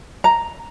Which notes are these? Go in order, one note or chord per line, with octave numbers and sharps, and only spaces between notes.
A#5